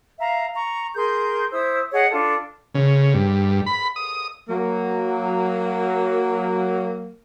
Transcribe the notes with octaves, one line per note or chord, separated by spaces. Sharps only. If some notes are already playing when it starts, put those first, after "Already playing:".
E5 F5 A#5
A#5 C#6
G#4 A#4 C6 G6
E4 C5 D#6 E6
G#4 C#5 D#5 F#5
D4 F4 A4
C#3
G2
B5
D#6
F#3 A#3